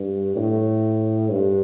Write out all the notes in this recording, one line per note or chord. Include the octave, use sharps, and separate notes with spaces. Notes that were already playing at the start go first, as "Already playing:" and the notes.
Already playing: G2
A2
G2